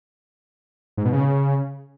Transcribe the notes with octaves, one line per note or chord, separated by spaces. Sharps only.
G#2
B2
C#3